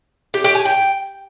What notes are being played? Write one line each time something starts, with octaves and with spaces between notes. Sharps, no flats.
G4
G4
G#5
G5